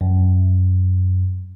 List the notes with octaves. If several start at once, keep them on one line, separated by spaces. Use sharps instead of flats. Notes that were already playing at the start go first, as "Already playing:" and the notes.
F#2